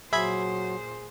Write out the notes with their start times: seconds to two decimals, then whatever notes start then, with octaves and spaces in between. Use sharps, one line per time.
0.13 A#2 F#3 G#4 C5 E5 B5 G#6